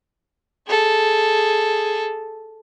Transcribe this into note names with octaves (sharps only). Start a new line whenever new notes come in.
G#4 A4